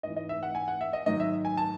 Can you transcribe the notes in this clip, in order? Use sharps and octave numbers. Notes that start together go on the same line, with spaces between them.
G#2 E3 D#5
D#5
E5
F#5
G#5
F#5
E5
D#5
G#2 D#3 F#3 D#5
E5
G#5
A5